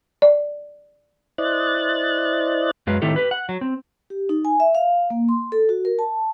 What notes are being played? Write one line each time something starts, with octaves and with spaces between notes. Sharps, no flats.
D5
E4 C5 D5 D#5 F#6 A6
F#2 F#3 G#3 B4 F5
A2 D#3 C4 E4 G4 A4
G4 B4
F#5
F#3
C4
G4
D#4
G#5
E5
F5
A#3
C6
A4
F#4
A#4
A5